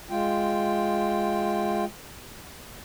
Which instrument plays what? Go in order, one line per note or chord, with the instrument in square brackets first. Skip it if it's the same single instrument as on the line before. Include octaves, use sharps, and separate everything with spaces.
[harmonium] G#3 F4 G5